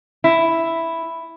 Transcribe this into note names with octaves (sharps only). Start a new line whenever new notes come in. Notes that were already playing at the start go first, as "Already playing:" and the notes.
E4